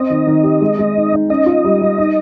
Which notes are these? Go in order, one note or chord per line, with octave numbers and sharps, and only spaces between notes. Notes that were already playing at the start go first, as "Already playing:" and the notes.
Already playing: C4 D#5
D#3
D#3
G4
G#3
G#3
D#4
D#4
C#4 D#5
F4
G3
G3
D#4